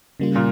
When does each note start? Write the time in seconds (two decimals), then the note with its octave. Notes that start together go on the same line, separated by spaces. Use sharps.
0.20 C#3 G3 A#3 F4
0.35 A#2